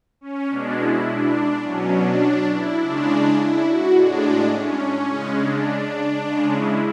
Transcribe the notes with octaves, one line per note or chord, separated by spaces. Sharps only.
C#4
B2 G#3 D4
E4
D4
B2 F#3 C#4
D4
E4
C#3 G#3 D4
E4
F#4
A2 G#3 D4
C#4
C#3 G#3
D4
C#3 G#3
E4